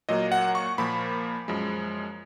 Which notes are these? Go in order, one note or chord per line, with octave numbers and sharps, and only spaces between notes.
A#2 F#3 A#3 D#5
F#5
C#6
A#2 F3 A#3 B5
F#2 F3 G#3